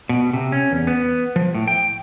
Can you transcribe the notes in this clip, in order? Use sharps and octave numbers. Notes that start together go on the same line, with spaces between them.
B2
C3
C#4
E2
B3
F3
A2
G5